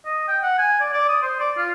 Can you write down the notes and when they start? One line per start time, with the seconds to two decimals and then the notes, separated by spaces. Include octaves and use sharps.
0.05 D#5
0.28 G5
0.43 F#5
0.58 G#5
0.80 D5
0.93 D5
1.09 D#6
1.23 C5
1.40 D5
1.57 F4